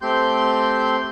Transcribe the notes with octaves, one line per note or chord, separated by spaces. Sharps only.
A3 C4 G4 C6 G6